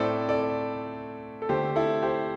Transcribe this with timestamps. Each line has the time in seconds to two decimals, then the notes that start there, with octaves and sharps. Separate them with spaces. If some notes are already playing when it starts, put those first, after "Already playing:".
Already playing: A2 A3 C4 A4 D5
0.29 A4 D5
1.42 A4
1.49 D3 A3 C4 G4 C5
1.76 E4 A4
2.03 G4 C5